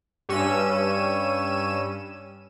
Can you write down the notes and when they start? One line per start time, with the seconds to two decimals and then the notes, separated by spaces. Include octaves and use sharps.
0.29 G2 C#4 E6 D#7 E7